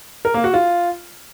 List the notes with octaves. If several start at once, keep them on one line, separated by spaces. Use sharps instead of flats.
A#4
A#3
F#4
F4